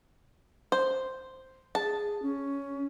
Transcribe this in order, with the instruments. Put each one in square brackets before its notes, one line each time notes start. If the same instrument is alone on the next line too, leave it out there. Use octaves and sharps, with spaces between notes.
[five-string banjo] C5
[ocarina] G#4 [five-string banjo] A5
[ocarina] C#4